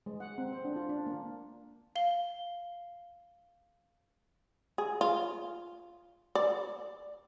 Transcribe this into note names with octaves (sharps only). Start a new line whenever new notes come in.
G#3
F#5
C4
C5
D4
F4
D4
A#3
F5 G7
G#4
F4
D5